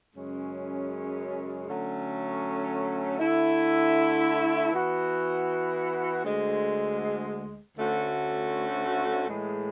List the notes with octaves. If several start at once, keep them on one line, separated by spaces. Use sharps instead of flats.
F#2 C#3 G#3 C#4
D3 F#3 A3 C#4
D3 A3 E4
E3 B3 F#4
D2 D3 G#3
D2 D3 A3 C#4 F#4
A2 E3 G#3